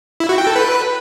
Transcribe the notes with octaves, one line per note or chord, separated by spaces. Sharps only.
E4
F#4
G5
A4
B4